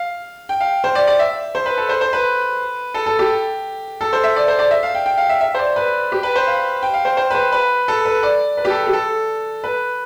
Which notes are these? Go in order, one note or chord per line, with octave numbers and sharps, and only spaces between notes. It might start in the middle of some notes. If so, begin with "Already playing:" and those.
Already playing: F5
G5
F5
C5
D5
D5
E5
C5
B4
A4
C5
C5
B4
A4
A4
G4
A4
C5
E5
D5
C5
D5
E5
F5
G5
G5
F5
E5
E5
C5
D5
B4
G4
B4
C5
F5
G5
F5
C5
C5
B4
C5
B4
A4
B4
D5
B4
G4
A4
G4
A4
B4